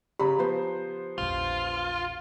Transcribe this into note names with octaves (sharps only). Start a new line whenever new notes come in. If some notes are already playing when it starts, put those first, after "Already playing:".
C#3 G4 A#5 B5
F3 B3 C5
A#1 E2 F4